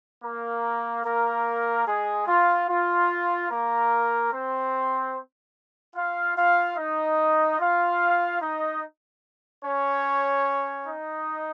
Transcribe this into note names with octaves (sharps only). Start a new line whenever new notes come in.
A#3 A#4
A#3 A#4
G#3 G#4
F4
F4
A#3 A#4
C4 C5
F4 F5
F4 F5
D#4 D#5
F4 F5
D#4 D#5
C#4 C#5
D#4 D#5